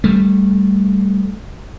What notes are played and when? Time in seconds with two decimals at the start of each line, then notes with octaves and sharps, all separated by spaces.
0.04 G3 A3